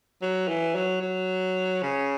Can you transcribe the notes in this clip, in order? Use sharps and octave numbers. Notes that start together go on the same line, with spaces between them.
F#3
E3
F#3
F#3
C#3